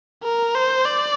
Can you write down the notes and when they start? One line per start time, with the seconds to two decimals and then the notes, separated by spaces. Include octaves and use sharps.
0.24 A#4
0.55 C5
0.85 D5